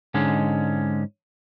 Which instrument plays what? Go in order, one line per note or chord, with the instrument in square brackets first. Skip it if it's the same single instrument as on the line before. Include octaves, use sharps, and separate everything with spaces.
[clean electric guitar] G#2 D3 G#3 C#4